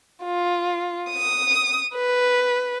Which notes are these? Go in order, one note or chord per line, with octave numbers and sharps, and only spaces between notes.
F4
D#6
B4